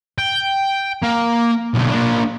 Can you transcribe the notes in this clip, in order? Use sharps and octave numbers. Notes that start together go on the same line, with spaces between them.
G5
A#3
B1 D3
A#3 D4